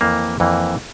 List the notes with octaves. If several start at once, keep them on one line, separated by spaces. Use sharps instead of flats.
F2 E3 A#3
F2 E3 A#3